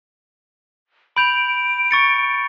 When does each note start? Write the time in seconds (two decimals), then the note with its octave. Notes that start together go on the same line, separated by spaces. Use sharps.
1.17 B5 G6 D7 F7
1.91 C#6 A6 C#7